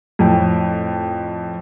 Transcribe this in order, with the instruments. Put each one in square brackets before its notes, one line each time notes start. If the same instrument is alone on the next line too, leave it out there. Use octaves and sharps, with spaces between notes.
[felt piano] F2 A2 G5